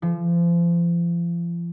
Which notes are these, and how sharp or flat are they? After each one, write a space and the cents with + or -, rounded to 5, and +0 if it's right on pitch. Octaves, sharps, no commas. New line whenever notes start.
F3 -35